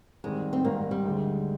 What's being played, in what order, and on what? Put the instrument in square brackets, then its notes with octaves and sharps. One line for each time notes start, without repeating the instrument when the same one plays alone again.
[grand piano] G#2 D#3 G3 C4 [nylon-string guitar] G#3
[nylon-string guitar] C4
[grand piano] G#2 D#3 G3 C4 [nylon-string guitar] A#3
[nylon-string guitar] G3
[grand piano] D2 D3 G#3